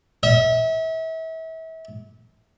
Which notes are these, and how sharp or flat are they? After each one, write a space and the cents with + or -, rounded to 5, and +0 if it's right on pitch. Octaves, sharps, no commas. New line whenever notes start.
E5 -35